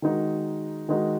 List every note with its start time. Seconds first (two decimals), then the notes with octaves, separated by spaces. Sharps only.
0.02 D#3 G#3 D#4 F#4
0.89 D#3 G#3 D#4 F#4